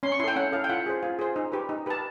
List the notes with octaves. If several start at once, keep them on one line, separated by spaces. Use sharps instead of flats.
C#4 C6
C#6
E4 A4 G5 C6
C#4 F#5
E4 A4 F5
G5
F4 F#5
G#4 C5
F4
G#4 C5
D#4
G4 B4
D#4
G4 B4 A5